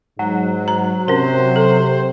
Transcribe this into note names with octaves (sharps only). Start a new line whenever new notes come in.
G#2 F#3
A#5
C3 C#4 A#4 C5
A4